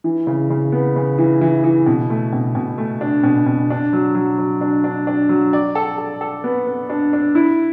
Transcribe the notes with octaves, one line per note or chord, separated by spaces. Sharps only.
E3
C#3
C#3
B3
C#3
E3
E3
E3
B2
A3
B2
B2
A3
D4
B2
B2
D4
F#3
F#3
F#3
D4
D4
D4
F#3
D5
A4
A4
A4
B3
B3
D4
D4
E4